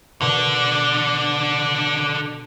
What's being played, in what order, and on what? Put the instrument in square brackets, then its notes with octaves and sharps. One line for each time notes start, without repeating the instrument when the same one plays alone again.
[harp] B2 [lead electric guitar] D3 D4